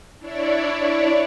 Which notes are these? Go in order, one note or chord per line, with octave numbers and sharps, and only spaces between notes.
D4 E4 C#5 D5